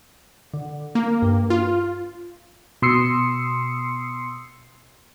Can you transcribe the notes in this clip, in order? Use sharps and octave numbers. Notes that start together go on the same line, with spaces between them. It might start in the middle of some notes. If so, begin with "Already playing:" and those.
D3
A#3
G2
F4
B2 C6 D#6 E6 C7 C#7